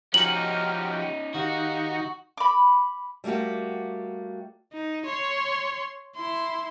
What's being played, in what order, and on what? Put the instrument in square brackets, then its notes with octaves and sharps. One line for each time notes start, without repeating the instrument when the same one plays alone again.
[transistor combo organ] F3 F#4 G4 [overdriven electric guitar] C#4 D#4 [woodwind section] A#5 F6 [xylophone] F#7
[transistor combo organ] D#3 D#4 [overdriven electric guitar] F#4 [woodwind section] G4 F5 F#5
[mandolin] B5 D6
[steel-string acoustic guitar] G3 A3 A#3 F#4 G4
[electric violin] D#4
C#5 C6
E4 C6